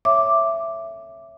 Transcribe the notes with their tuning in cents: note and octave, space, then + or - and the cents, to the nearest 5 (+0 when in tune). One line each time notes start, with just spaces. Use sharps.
C#5 +0 E5 +10 D6 +0